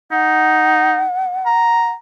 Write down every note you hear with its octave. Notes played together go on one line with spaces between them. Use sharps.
D#4 F#5
A#5